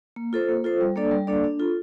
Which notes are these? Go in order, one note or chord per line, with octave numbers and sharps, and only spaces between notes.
A#3
F4 A4 C5
A#3
F4 A4 C5
G3
A#3 D4 A4 D5
G3
A#3 D4 A4 D5
D4
F4 A4